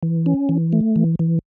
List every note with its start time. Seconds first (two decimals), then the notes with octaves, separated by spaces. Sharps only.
0.03 E3
0.26 C#4
0.49 E3
0.73 A3
0.96 E3
1.19 E3